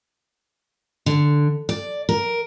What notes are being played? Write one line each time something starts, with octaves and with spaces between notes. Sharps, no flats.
D3
D5
A#4